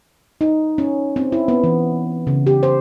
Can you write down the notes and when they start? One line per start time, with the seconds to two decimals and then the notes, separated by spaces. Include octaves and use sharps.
0.41 D#4
0.78 C#4
1.16 C4
1.32 E4
1.48 B3
1.64 E3
2.27 C#3
2.46 G4
2.63 C5